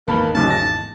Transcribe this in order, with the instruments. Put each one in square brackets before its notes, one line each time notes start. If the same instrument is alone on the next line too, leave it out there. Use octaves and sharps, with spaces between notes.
[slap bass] G#1 E2 D#3 [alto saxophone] A#3 [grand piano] B4 A5 B5
[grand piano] D1 B1 C#3 [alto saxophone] A5
[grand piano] A#6